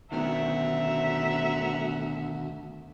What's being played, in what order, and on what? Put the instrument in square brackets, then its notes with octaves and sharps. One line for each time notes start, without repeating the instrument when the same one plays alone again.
[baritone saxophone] D2 [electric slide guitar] B2 D#3 [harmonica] C4 F#5 A#5 [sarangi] E5